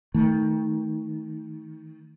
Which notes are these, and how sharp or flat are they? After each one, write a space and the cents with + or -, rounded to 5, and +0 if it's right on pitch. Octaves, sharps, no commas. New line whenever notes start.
D#3 +25 A3 +0